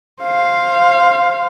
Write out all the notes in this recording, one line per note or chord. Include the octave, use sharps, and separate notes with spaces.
C5 F5